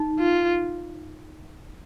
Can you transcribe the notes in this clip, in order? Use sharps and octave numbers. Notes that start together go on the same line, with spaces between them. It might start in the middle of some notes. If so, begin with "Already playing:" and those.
Already playing: D#4
F4